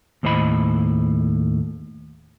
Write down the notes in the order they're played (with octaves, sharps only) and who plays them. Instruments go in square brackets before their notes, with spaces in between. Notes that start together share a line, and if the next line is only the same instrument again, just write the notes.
[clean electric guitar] D#2 A2 C5 D#5 B5